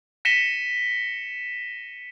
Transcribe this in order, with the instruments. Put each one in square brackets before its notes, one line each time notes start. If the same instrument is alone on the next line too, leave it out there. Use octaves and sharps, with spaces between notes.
[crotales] A#6 B6 C#7 D#7 E7 G7